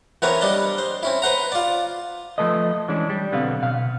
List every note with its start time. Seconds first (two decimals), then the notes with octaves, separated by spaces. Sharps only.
0.22 E3 B3 C4 A#4 B4 C#5
0.41 G3 D4 D5 D#5
0.78 C5
1.03 C4 C#4 E4
1.22 B4 C5 F#5 A#5
1.52 F4 D5
2.38 F3 A3 A4 B4 D#5
2.88 E3 G#3 C#4 D4
3.10 G3
3.32 B1 D3 B3 C4 F5
3.63 B2 F5